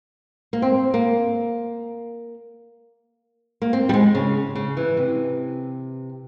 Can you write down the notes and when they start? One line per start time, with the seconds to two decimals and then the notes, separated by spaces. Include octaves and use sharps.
0.53 A#3
0.62 C4
0.94 A#3
3.62 A#3
3.73 C4
3.89 G3
3.94 G#3
4.15 C#3
4.55 C#3
4.77 E3
4.97 C3